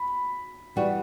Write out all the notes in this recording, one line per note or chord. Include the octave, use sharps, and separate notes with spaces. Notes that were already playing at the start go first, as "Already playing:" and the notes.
Already playing: B5
E3 G3 B3 F#4